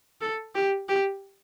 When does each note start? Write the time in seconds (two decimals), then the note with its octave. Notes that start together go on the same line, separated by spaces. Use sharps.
0.21 A4
0.55 G4
0.88 G4